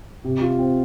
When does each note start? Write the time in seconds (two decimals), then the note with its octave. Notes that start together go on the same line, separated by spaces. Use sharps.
0.24 C3
0.42 F4
0.59 C4